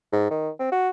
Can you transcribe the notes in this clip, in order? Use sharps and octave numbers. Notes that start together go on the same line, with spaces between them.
G#2
D#3
C4
F#4